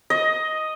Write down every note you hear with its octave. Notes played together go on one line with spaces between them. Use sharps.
D#5